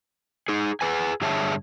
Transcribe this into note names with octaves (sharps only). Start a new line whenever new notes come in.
D#4 G#4
G#4 B4 G#5
G2 D3 G#4 C#5 E5 A5